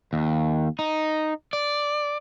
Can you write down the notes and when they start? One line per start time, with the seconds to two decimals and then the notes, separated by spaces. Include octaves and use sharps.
0.13 D#2
0.79 D#4
1.53 D5